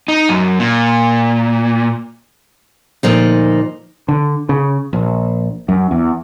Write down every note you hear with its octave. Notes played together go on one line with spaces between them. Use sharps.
D#4
F#2
A#2
D2 A#2 F3 D#4
D3
C#3
A#1
F#2
E2